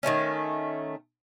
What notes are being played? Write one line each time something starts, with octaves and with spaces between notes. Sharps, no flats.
D#3 F3 A3 C#4